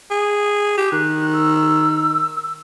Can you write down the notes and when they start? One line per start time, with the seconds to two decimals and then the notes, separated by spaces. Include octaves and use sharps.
0.10 G#4
0.78 G4
0.92 D#3 F#6
1.34 E6